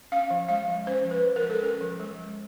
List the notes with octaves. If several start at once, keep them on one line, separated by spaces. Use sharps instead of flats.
C#4 F5
F3
G#3 F5
F3
C#4 C5
F3
B4
G#3
A#4
F3
A4
C#4 A#4
F3
G#3
F3